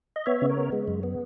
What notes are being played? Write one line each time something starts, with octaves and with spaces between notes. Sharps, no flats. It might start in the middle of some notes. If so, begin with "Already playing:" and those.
D#5
B3 C#5 E5
C#3
A#4 C#5
B3
G#3
F#2
B3